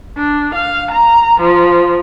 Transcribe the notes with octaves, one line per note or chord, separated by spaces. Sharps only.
D4
F5
A#5
F3